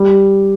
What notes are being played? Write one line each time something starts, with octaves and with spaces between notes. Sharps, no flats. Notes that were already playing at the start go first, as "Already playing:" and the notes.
Already playing: G3